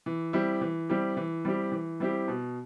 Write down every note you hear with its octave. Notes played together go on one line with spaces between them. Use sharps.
E3
G3 C4 E4 G4
E3
G3 C4 E4 G4
E3
G3 C4 E4 G4
E3
G3 C4 E4 G4
B2